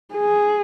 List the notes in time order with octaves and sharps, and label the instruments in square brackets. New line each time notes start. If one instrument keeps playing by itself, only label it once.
[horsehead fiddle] G#4